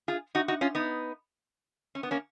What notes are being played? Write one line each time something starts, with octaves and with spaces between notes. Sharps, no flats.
F4 G#4
D#4 F#4
D#4 F#4
C#4 F4
B3 D#4
C#4
B3
A#3 C#4